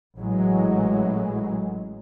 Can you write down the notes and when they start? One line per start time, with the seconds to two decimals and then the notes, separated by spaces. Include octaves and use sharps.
0.17 A1 A2 F#3 G#3